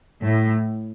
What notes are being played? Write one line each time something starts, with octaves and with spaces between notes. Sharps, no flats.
A2